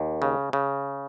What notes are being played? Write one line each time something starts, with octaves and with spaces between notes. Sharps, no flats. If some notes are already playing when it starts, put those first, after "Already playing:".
Already playing: D#2
C#3
C#3